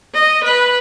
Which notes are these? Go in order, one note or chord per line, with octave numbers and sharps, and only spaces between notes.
D#5
B4